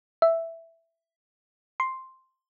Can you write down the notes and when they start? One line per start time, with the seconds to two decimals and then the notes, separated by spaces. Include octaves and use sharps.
0.22 E5
1.80 C6